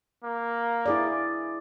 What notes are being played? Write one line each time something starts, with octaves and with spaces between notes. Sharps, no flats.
A#3
E4 G#4 D5